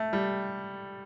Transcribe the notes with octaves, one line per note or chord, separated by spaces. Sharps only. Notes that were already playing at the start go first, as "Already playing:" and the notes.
Already playing: A3
G3